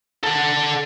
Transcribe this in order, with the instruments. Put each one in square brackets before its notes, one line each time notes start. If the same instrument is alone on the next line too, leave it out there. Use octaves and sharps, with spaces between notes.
[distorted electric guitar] A4 F#5